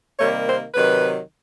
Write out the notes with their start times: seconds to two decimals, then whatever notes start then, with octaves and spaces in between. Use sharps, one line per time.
0.19 C3 D#3 G3 A#3 C#5
0.47 C5
0.75 C3 D#3 F#3 B4